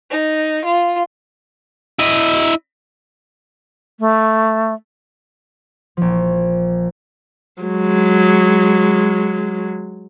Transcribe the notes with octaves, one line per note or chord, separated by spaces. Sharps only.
D#4
F4
E4 D#5
A3
A#1 F3
F#3 G#3